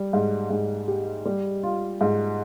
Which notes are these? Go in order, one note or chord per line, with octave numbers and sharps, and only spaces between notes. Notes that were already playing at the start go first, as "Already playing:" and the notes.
Already playing: G3
G#2
G#2
G4
G3
F4
G#2